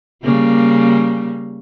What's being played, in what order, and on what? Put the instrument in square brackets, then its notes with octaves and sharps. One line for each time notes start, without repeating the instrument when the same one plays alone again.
[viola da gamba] C#3 G3 A#3